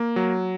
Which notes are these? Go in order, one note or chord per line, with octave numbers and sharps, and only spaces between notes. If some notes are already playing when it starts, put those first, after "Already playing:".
Already playing: A#3
F#3